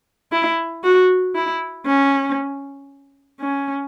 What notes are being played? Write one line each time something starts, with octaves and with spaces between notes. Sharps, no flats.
E4
F#4
E4
C#4
C#4